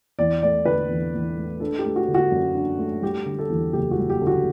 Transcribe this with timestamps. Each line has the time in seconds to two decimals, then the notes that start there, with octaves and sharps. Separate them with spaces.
0.19 E2 D5
0.42 A3 D5
0.65 D3 B4
0.90 E2
1.14 E2
1.37 A3
1.60 D4 A4
1.79 G4
1.85 A3
1.96 F#4
2.08 D3
2.14 F#4
2.31 F#2
2.55 D4
2.78 A3
3.03 G3 G4
3.26 D3
3.39 A4
3.49 E2
3.73 F#1 G4
3.91 F#4
3.97 G3
4.10 G4
4.21 D3
4.27 F#4